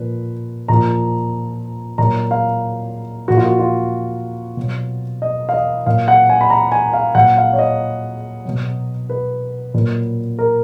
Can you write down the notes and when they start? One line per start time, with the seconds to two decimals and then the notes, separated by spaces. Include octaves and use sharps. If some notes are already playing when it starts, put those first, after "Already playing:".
Already playing: A#2 F3 B4
0.68 A#2 F3 A#5
1.98 A#2 F#3 A#5
2.31 F5
3.28 A#2 F3 F#4
3.37 F4
3.46 F#4
3.59 F4
4.57 B2 F#3
5.22 D#5
5.49 F5
5.54 D#5
5.86 A#2 F#3 F5
6.08 F#5
6.29 G#5
6.41 B5
6.50 A#5
6.72 G#5
6.93 F5
7.15 A#2 F#3 F#5
7.38 F5
7.53 C#5
7.58 D#5
8.45 B2 F#3
9.09 B4
9.74 A#2 F#3
10.39 A#4